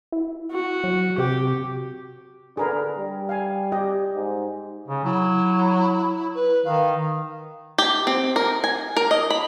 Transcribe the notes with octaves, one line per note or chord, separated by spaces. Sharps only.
E4
F#4
F#3
C3 G4
D3 G#4 A#4 B4
G3
F5 G#5
G4 D#5
G#2
C#3
F#3 E4
B4
D#3 F5
G4
C4
A#4
G#5
A#4
D#5
B5